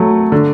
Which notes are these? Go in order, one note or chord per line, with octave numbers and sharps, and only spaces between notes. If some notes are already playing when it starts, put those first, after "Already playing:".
Already playing: F#3 A3
D3